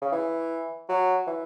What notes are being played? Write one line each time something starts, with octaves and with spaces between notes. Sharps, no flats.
C#3
E3
F#3
E3